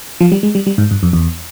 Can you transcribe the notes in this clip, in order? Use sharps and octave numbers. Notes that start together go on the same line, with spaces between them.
F3
G3
G#3
G3
G3
G#2
G2
F2
E2